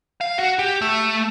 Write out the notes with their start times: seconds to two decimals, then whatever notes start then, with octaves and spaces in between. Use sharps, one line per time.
0.21 F5
0.38 F#4
0.59 G4
0.81 A3